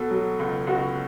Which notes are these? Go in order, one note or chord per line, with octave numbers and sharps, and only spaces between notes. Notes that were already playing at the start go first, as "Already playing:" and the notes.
Already playing: B2 A4
F#3
C#2
C#2 F#4